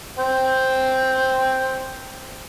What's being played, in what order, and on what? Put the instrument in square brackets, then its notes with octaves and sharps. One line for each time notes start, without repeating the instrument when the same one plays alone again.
[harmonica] C5 G5